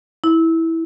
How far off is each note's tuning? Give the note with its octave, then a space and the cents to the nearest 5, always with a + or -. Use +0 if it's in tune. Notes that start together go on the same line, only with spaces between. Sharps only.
E4 -10